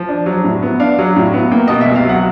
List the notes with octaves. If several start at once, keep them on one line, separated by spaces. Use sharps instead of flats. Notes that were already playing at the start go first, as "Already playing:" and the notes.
Already playing: F3
D4
F#3
A2
B3
D4 F5
F#3
A2
B3
A#3 G5
B2 D#5
E5
C2
F5
F#3 F#5